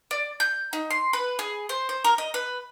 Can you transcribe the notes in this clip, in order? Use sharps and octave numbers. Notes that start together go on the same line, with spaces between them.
D5
G6
D#4
C6
B4
G#4
C5
C5
A#4
D#5
B4